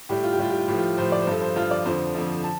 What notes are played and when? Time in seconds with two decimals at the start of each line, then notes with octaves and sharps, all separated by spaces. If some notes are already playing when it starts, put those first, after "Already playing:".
0.09 A2 G3 G4
0.24 F4
0.33 G4
0.38 A2 G3 F4
0.50 G4
0.59 F4
0.68 A2 F3 G4
0.78 F4
0.97 A2 F3 C5
1.12 D5
1.22 C5
1.27 G2 F3 A4
1.42 C5
1.56 G2 F3 F4
1.71 D5
1.85 F2 D3 F3 C5
2.14 F2 D3 F3
2.44 A5